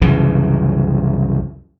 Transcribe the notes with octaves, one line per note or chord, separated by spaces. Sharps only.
C2 F#2 C#3 E3